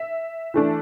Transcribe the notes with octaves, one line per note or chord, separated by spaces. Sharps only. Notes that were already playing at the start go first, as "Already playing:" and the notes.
Already playing: E5
E3 A3 D4